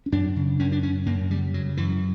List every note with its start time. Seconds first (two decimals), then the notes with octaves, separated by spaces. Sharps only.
0.06 C#4
0.12 F#2 D4
0.36 C#3
0.59 F#2 C#4
0.72 D4
0.83 F#2 C#4
1.06 F#2 A#3
1.30 C#3 G3
1.54 C#3 F#3
1.77 F#2 E3